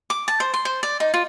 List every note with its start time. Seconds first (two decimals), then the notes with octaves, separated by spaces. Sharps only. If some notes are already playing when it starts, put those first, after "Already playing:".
0.10 D6
0.28 A5
0.40 C5
0.54 C6
0.65 C5
0.83 D5
1.00 D#4
1.14 F4